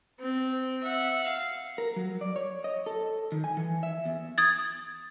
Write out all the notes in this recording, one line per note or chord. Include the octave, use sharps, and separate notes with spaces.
C4
E5 F#5
F5
A#4
F#3
D5
C#5
D#5
A4
D#3
G#5
E3
E5
E2
D#6 G#6 A6